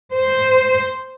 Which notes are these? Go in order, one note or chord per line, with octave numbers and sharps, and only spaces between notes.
C5